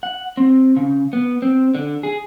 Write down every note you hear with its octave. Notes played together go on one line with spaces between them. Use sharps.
F#5
C4
C#3
B3
C4
D3
G#4